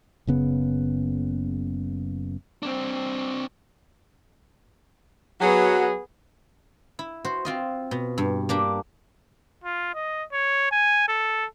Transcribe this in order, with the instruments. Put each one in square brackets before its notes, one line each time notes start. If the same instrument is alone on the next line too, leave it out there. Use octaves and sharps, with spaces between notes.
[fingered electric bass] F#1 C#3 B3
[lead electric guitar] C4 D4
[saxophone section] F#3 F#4 [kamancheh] B3 G#4
[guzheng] E4
F#4 C5
C4 F4 D#5
B2
G2
A#3 D4 G4
[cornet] F4
D#5
C#5
G#5
A4